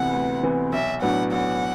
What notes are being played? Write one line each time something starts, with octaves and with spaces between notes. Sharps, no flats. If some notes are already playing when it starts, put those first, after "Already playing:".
Already playing: D2 C3 E3 B3 F#5
D2
C3 E3 B3
B1 E5
A2 F#3 B3 D4 F#5
B1 F#5